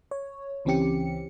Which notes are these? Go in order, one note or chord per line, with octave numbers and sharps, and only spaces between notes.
C#5
C#2 E3 C4 C#4 G4 C#7